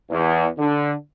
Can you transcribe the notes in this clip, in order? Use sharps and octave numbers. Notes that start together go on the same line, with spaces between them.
E2
D3